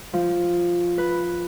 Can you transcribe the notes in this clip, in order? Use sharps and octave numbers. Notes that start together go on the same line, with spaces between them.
F3
B4